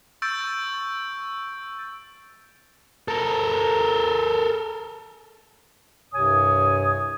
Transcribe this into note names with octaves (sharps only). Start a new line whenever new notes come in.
C#6 E6 G6 A6 D7
A4 A#4
C2 G2 C3 C#5 G#5 D#6